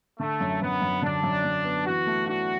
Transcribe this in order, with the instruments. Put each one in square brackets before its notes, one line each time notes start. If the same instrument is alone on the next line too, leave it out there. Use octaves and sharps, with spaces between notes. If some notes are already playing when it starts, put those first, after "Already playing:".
[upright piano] D3 [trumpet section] A3
[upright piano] F#2
[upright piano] F#2 [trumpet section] B3
[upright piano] F#2
[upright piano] D3 [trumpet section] D4
[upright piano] F#2
F#2
B3
[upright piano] E3 [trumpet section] F#4
[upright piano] A3
[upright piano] D4 [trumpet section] F#4